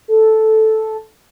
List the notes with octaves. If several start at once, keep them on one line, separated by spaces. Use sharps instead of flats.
A4